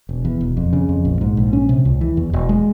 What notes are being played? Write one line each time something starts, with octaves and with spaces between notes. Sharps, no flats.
E1
E2
E1
F2
C#3
F2
A#1
G#2
A#1
C#4
C3
C#2
E3
E2
E1
G#3